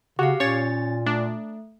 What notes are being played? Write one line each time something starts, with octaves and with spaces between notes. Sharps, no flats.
C#3 F#4 G4 F5
A#2 C#4 C#5 A6
A3 D4